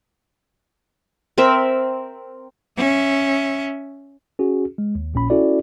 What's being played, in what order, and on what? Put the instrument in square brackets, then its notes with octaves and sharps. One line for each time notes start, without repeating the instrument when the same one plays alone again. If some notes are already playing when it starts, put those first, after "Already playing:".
[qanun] C4 A#4 E5
[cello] C#4 E5
[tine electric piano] C#4 F#4 G#4
G#3
D#2
A#1 A#2 C#4 B5
C#4 E4 F#4 A4 D5